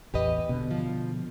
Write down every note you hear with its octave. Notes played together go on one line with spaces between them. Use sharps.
A1 E2 G4 B4 D#5
B2 D3
F3